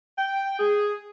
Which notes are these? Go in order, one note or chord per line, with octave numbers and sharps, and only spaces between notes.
G5
G#4